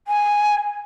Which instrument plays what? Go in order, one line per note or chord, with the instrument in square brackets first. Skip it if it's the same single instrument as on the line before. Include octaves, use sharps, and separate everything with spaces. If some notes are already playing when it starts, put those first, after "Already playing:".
[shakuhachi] G#5